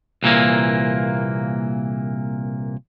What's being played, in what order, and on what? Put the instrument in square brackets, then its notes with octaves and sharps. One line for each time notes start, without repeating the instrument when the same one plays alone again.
[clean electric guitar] C2 A#2 E3 A#3